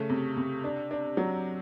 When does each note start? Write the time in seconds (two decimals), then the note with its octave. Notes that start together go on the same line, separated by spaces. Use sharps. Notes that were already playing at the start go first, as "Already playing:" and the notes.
Already playing: C#3 A3
0.09 C3
0.37 C3
0.64 D4
0.91 D4
1.17 F#3